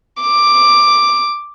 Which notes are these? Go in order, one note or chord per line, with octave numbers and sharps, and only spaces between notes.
D6